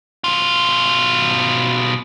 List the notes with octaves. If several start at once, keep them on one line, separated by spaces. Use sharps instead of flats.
B2 F4